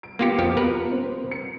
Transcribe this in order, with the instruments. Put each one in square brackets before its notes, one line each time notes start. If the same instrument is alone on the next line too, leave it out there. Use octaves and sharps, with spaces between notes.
[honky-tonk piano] D7
[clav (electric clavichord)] A#3 F4 G4 [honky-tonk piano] B3 C#7
[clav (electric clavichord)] F2 F3 G4
[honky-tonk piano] B2 [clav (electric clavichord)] A#4 B4
[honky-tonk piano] C4 C5
C#7